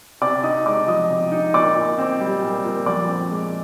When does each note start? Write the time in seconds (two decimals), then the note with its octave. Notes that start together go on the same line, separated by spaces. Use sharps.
0.22 C3 D5 D6
0.43 D#4 D#5 D#6
0.66 G#3 D5 D6
0.87 F3 D#5 D#6
1.10 C3
1.32 D#4
1.54 A#2 D5 D6
1.76 A#2
1.98 C4
2.20 G3
2.42 A#2
2.64 A#2
2.86 F2 D5 D6
3.08 C4
3.30 G#3